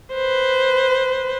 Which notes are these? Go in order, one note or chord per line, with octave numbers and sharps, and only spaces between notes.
B4 C5